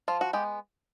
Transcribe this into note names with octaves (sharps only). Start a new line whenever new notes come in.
F3 F4
F#4
G#3 B3 G4